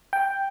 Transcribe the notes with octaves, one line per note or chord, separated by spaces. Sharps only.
G5